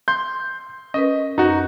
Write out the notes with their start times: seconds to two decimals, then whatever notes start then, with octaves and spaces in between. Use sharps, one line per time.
0.08 C6 G6
0.94 C#4 A#4 B4 D#5
1.38 F#2 D#4 F#4